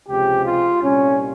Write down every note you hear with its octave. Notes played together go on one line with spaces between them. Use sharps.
C#2 C3 F3 G#3 G4
F4
C2 A#2 G3 C#4